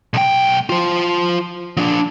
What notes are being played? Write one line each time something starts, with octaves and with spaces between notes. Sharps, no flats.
B1 G5
F4 C5
F3 D4